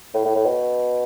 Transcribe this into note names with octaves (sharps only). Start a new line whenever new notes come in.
A2
A2
A2
B2